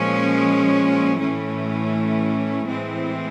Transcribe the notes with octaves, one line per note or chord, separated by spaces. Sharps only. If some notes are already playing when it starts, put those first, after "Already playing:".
Already playing: A#2 F3 G#3 C#4
A2 E3 A3 C#4
A2 E3 G#3 C4